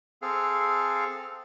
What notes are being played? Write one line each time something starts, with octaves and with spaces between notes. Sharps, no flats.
C4 G#4 A4 F5